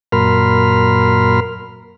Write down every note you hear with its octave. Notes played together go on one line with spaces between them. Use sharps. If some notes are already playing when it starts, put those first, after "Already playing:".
F#2 A#2 A#4 B5 C6 F6